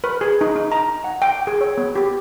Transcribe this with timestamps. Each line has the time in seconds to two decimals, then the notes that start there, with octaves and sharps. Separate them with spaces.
0.04 B4
0.21 G#4
0.41 D#4
0.56 D#4
0.72 A#5
1.04 F#5
1.22 G5
1.47 G#4
1.61 C#5
1.78 B3
1.95 G4